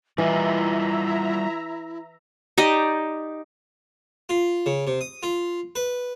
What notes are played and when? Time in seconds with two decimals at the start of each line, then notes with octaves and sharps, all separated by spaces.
0.18 E3 G3 E4 F4 D#5 E5 A#5
2.58 D#4 G4 D5 D#5
4.29 F4
4.66 C#3
4.87 C3
5.01 D#6
5.23 F4
5.75 B4